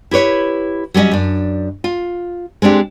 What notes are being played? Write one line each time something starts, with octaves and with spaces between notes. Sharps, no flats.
E4 G4 B4 C#5
F#3 G3 A#3 C#4 D#5
F#2 D4
F4
G#3 C4 D4 G4